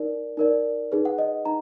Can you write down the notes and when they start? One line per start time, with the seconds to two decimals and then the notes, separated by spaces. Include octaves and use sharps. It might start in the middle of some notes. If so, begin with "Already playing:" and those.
Already playing: D#4 A#4 D5
0.37 D#4 A#4 D5
0.92 D#4 G#4 B4
1.05 F#5
1.18 D#5
1.45 D#4 A#5